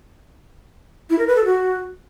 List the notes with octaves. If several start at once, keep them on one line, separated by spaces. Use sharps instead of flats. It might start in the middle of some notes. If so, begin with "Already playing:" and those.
E4
A#4
B4
A4
F#4